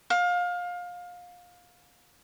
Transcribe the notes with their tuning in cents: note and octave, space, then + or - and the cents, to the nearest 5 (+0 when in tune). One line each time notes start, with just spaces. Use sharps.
F5 +25